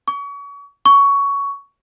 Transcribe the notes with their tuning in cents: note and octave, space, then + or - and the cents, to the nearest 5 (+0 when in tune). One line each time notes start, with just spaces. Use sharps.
C#6 +35
C#6 +15